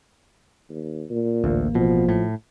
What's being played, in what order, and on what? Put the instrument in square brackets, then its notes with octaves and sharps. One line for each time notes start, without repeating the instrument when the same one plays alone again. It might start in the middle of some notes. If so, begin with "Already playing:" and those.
[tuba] D#2
A#2
[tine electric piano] A1 A#3 [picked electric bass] D2
[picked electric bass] B2 [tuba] F3
[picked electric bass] A2